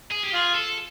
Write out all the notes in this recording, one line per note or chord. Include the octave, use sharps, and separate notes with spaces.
G#4
G4
F4 G#4
A4